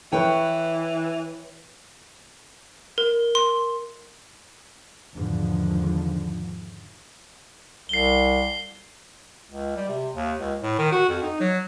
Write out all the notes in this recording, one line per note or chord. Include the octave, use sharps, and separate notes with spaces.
E3 B4 C#5 G5
A#4
C6
E2 G#2 D3 D#3 F3
C2 C7 G7
C#2
G3
C3
D#2
C#2
A2
D#3
F#4
F2
D#4
F#3